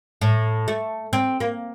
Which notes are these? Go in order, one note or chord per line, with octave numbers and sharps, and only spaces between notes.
A2
A3
C4
A#3